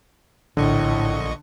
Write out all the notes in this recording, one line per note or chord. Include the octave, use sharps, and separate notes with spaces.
A#1 A2 D3 D#5 C#6